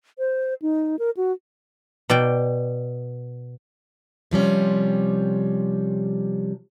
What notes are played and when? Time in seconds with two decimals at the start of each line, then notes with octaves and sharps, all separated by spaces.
0.19 C5
0.62 D#4
0.99 A#4
1.17 F#4
2.10 B2 D5 G5
4.31 C3 F3 G3 C#4